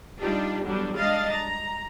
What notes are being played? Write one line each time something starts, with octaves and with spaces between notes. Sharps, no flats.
G3 D4 D#4 F4 G4
E2 D3 F#3 G3 D4
G3 G#3 D4 D#5 F5 A6
A#5